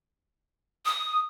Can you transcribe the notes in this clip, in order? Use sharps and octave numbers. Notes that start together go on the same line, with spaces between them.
D#6